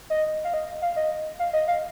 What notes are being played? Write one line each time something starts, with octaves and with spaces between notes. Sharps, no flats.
D#5
F5
D#5
F5
D#5
F5
D#5
F5